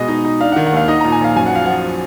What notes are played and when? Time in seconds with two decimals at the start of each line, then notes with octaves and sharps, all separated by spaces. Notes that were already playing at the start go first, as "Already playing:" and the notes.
Already playing: B2 G#3 D#5
0.08 D#4
0.24 D#4
0.40 D4 F5
0.52 D#3 F#5
0.67 F#5
0.72 D#2 F5
0.88 D#4 D#5
1.01 A#2 A#5
1.12 G#5
1.20 A#1 F5
1.36 F#2 G#5
1.46 F#5
1.52 F3 F5
1.66 F3 F#5